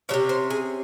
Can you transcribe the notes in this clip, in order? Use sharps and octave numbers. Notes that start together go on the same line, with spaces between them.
C3 F#3 C#4 C#5
C5
G#4